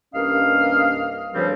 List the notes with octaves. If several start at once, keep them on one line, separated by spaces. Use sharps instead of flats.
C2 G2 A#3 C#4 D#5 F5
D2 G2 C#3 F3 G3 C4